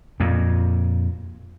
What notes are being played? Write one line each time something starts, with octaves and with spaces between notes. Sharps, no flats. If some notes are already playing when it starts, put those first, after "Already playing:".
F2 A#2